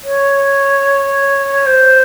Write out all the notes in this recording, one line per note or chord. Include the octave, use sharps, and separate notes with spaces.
C#5
C5